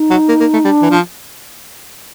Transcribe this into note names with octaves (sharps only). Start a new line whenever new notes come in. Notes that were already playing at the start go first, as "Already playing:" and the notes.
Already playing: D#4
F#3
A#3
A#3
A3
G3 D4
E3
F3